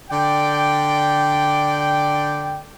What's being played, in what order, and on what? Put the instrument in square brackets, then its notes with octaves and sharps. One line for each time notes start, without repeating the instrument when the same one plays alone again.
[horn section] D3 D5 G5